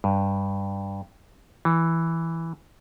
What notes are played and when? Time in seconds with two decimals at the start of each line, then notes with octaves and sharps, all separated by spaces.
0.04 G2
1.65 E3